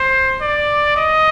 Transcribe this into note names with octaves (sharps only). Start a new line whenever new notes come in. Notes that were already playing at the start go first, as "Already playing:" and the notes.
Already playing: C5
D5
D#5